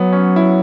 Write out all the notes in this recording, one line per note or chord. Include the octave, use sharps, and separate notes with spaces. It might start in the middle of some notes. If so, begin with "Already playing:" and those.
Already playing: F#3 B3
C#4
E4